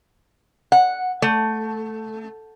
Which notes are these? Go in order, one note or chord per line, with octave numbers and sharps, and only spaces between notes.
F#5
A3